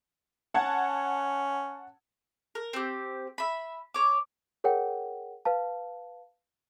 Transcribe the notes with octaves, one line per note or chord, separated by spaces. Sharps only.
C#4 F#5 A5 G#6
A#4
C4 G4
E5 B5
C#5 D6
G#4 A#4 C#5 F#5 G5
B4 F5 A5